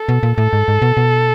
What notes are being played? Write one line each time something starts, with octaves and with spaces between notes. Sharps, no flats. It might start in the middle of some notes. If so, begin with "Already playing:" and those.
Already playing: A4
B2
A#2
A2 A4
G#2
G#2
B2
B2